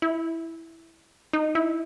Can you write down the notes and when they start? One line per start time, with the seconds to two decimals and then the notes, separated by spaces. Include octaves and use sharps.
0.02 E4
1.33 D#4
1.55 E4